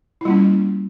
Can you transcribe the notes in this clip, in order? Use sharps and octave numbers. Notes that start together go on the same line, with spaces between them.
E4
G3 A#3 C#4 F4